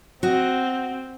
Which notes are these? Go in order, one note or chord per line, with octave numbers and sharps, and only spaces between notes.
C4 F#4 D#5